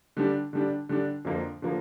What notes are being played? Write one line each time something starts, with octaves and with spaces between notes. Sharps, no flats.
D3 G3 D4
D3 G3 D4
D3 G3 D4
F2 D3 F3 A#3
D3 F3 A#3